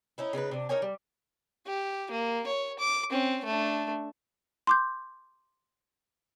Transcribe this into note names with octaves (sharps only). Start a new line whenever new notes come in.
C#4 D#4 E4
C#3 D#4 A#4 B4
C3 D4
D#4 A#4 C#5 G#5
G3
G4
A#3
C#5
D6
C4 C#4
A3 D4
C6 D6 G6